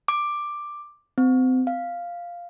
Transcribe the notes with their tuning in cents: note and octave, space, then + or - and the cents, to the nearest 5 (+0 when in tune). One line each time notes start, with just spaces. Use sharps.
D6 +5
C4 -30
F5 -5